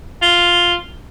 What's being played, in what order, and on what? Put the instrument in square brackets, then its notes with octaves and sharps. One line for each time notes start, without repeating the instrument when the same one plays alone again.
[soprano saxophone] F4